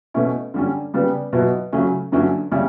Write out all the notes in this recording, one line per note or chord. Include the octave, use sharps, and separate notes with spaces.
B2 A3 C#4 E4
D3 G3 C#4
C#3 G3 B3
B2 F#3 B3 E4
C#3 F#3 A3 C#4 E4
G2 D3 F#3 C#4 E4
C#3 G3 C#4 E4